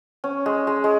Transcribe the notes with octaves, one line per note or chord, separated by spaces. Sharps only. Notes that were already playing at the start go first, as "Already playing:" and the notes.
C#4
G#3
G#3
G#3